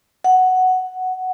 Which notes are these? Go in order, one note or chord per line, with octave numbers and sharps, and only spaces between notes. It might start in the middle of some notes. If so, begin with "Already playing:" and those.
F#5